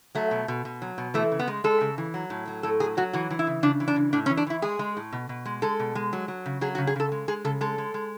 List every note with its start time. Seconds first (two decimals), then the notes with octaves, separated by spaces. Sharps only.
0.15 F#3 A3
0.31 B2
0.48 B2
0.65 B2
0.82 F#3
0.98 B2
1.14 E3 A3
1.32 C#3
1.39 B3
1.48 G#3
1.64 G#3 A4
1.81 C#3
1.98 E3
2.14 F#3
2.30 A2
2.48 F#3
2.63 A2 A4
2.80 F#3 G#4
2.97 F#3 F#4
3.13 E3 F#4
3.30 E3
3.39 E4
3.47 C#3
3.63 C#3 D4
3.80 E3
3.88 D4
3.96 C#3
4.13 A2 D4
4.26 C#4
4.30 E3
4.37 D4
4.47 E3 E4
4.62 G#3 G#4
4.79 G#3
4.97 A2
5.13 B2
5.29 B2
5.45 G#3
5.62 G#3 A4
5.80 B2
5.95 G#3
6.13 F#3
6.28 F#3
6.46 C#3
6.61 F#3 G#4
6.75 F#4
6.78 C#3
6.87 G#4
6.96 C#3 A4
7.12 G#3
7.28 G#3 G#4
7.44 C#3 A4
7.61 G#3 A4
7.78 G#3
7.94 G#3